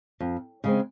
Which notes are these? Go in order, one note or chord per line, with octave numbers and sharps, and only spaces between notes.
F2
C#3 G#3 C4